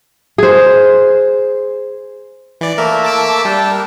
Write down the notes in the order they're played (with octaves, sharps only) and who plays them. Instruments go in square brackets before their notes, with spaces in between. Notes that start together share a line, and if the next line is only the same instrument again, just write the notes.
[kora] G#4 C5
[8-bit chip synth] E3 D5
[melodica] A3 A#3 E5 [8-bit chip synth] A#4
[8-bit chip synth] A5 D6 E6
[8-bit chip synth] G3 [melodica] D4 G5 A5
[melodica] A#4